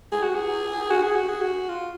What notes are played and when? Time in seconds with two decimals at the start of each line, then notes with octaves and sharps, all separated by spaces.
0.12 G#4
0.23 F#4
0.35 G#4
0.90 F#4
1.03 G#4
1.15 F#4
1.29 G#4
1.41 F#4
1.69 F4